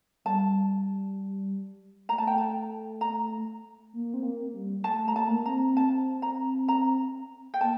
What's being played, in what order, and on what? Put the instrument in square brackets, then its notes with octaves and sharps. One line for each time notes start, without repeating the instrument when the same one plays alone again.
[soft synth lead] G3 [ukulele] A5
[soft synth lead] A3 [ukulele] A#5
[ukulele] A5
G5
A5
A#5
[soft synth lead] A#3
C4
A#3
G3
[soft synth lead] A3 [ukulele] A5
[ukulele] A#5
[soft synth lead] A#3 [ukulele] A5
[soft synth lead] A3
A#3
[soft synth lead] C4 [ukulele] A#5
[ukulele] A5
A#5
A#5
G5
[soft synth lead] A#3 [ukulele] A5